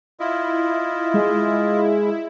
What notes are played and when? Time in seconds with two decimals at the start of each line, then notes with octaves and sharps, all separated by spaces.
0.20 E4 F4 D#5
1.14 G#3